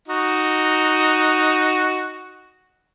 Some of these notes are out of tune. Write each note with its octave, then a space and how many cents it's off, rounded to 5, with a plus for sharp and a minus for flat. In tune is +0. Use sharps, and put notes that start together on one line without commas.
D#4 +0 F#4 +0